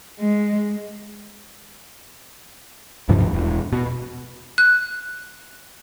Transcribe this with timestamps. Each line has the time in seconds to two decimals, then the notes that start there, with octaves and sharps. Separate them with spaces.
0.19 G#3
3.09 D1 G2 C3 F3
3.33 E1
3.73 B2
4.58 F#6